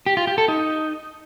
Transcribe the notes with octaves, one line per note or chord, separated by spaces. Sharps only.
G4
F4
G4
A4
D#4